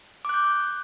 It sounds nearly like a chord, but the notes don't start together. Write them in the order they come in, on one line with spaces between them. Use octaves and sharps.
D6 F#6 G6